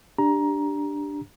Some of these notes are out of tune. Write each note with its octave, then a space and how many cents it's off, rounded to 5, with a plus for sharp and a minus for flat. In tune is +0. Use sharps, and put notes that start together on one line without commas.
D4 +0 G4 +0 A#5 +15